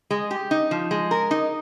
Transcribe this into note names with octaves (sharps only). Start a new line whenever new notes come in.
G#3
G4
D#4
F3
G#3
A#4
D#4